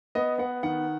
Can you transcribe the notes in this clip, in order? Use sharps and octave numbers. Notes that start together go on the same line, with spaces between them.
B3 D#5
B3 F#5
D#3 F#5